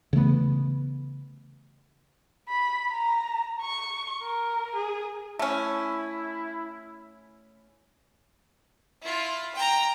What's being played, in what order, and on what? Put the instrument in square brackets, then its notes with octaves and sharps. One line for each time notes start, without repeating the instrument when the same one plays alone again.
[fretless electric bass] C#3 E3 A3 B3
[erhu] B5
A#5
C#6
A#4
G#4
[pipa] A3 C#4 [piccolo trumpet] E4
[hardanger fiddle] E4 F4
G5 A#5